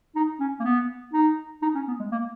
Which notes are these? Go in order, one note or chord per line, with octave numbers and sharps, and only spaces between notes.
D#4
C#4
A#3
B3
D#4
D#4
C#4
B3
G#3
A#3